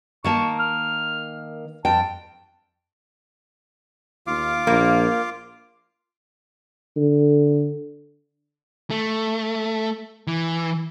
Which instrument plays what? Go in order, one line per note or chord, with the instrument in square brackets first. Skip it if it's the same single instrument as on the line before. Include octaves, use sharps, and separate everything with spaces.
[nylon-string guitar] D#3 A#3 A5 [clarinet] C#6
[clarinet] F6
[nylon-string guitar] F2 G5 [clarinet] A5
[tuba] D#2 [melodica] F4 F5 D6
[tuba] A#1 [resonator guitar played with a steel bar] A#3
[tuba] D3
[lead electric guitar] A3
E3